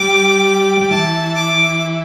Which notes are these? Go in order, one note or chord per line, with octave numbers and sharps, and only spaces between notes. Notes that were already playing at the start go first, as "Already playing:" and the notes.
Already playing: G3 D6
G3
E3 A5
D6